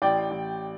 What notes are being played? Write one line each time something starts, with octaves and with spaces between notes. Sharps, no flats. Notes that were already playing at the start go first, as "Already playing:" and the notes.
A1 D5 G5
A1